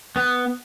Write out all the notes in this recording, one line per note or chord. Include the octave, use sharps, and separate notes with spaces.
B3